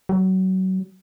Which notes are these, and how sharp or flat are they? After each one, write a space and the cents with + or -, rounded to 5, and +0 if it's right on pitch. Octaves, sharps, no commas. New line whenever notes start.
F#3 +25